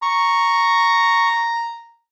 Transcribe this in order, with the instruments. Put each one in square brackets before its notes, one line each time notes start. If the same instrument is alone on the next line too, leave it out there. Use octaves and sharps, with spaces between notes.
[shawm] A#5 [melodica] C#6